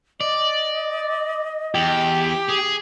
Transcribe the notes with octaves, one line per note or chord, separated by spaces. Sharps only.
D5 D#5
E2 G4
G#4